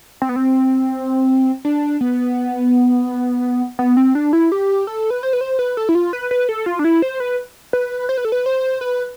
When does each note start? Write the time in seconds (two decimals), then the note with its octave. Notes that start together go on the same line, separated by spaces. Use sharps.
0.22 C4
0.29 B3
0.36 C4
1.65 D4
2.01 B3
3.79 B3
3.97 C4
4.15 D4
4.33 E4
4.52 G4
4.87 A4
5.10 B4
5.23 C5
5.33 B4
5.41 C5
5.59 B4
5.77 A4
5.89 E4
5.95 F4
6.13 B4
6.31 B4
6.49 A4
6.66 F4
6.79 D4
6.84 E4
7.02 C5
7.20 B4
7.73 B4
8.09 C5
8.17 B4
8.25 A4
8.32 B4
8.46 C5
8.81 B4